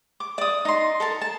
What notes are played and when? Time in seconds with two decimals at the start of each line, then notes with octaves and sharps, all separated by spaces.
0.20 D6
0.38 D5 D#6
0.65 D#4 C6
1.00 A4 A#4 A5
1.21 A5